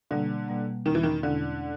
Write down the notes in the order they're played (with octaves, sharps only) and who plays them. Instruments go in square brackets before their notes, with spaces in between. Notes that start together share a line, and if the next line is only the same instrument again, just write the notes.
[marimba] B2 G3 A#3 [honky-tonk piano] D3
[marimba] B2 G3 A#3
[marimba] E2 B2 G#3 C#4 E4 [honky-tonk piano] D#3
[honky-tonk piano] E3
D#3
[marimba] E2 B2 G#3 C#4 E4 [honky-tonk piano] D3